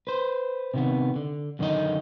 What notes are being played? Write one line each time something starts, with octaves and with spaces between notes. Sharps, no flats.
B4 C5
C3 D#3 B3
D3
F#2 D3 D#3 D#4 D#5